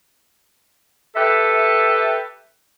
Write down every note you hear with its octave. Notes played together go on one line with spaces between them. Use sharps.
G4 A4 B4 E5